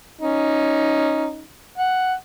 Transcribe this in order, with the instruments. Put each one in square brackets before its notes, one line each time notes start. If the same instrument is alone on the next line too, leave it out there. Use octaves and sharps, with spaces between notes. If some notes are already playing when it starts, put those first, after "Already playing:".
[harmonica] C#4 D#4
F#5